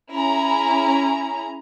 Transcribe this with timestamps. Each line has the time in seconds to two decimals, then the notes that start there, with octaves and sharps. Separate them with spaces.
0.13 C#4 E4 G#4 A#5